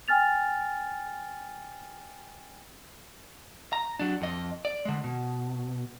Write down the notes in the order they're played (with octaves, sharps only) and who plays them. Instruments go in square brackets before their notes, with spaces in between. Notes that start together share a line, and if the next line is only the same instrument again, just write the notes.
[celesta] G5 G#5 F6 A6 F7
[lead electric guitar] A#5
F#3 D4
F2 D#5
D5
D3 G#3
B2